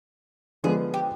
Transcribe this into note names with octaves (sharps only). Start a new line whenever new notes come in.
D3 F3 G#3 B3 G#4
G4